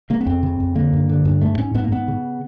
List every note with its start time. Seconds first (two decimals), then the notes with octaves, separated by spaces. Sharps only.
0.10 C#3 A#3
0.21 B3
0.26 F2 C4
0.43 C#3
0.60 F2
0.75 D3 A#3
0.93 G2
1.09 D3
1.25 G2
1.41 G#2 A3
1.58 G#2 C#4
1.74 G#2 B3
1.84 A#3
1.91 G#2 B3
2.08 C#3